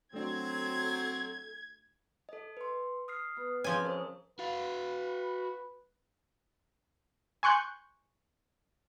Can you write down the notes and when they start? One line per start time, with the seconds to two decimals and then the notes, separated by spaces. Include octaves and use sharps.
0.14 F#3 A3 C4 D4 F#4 A4 G#6
2.29 A4 D#5
2.57 B4 C6
3.08 D#6 F6 C7
3.37 B3
3.64 C#3 F3 C4 F4 G#4 C#5 G#5
3.85 C4 A#4 C5 D#5
4.39 F#4 B4 F5
7.43 G#5 C6 C#6 F#6 G6